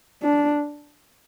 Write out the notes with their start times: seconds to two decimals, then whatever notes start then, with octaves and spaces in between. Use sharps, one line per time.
0.22 D4